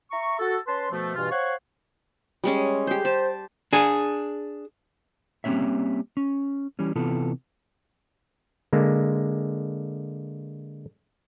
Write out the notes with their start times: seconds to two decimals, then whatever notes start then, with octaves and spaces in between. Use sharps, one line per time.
0.11 E5 A#5 C#6
0.39 F#4 A4
0.67 C#4 B4 A5 C6
0.91 B2 F3 A3
1.15 G2 B2 E3 F4
1.31 C5 C#5 F5 F#5 C#6
2.44 G3 G#3 C#4
2.87 G4 G#4 C5
3.05 C5 A5
3.73 D4 G#4
5.44 G3 A#3 C4 C#4 C#5 E5
6.17 C#4
6.79 E3 G3 C#4
6.96 C3 E3 B3 F4 A4
8.73 D3 G#3 A#3